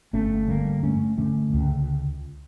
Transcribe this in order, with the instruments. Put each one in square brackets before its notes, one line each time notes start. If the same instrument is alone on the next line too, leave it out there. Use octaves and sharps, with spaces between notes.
[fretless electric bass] G1 A3 C#4
D3 G3 A#3
G2 A3 C#4
D3 A3 C#4
C#2